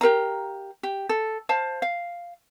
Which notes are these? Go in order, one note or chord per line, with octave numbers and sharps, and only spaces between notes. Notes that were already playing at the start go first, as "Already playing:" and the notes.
G4 A#4 F5 A#5
G4
A4
C5 F5 A5
F5